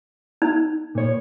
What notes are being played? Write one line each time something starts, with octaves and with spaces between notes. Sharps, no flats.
D#4
A#2 C#5